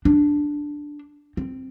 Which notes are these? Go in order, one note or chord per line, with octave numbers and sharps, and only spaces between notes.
D4
C4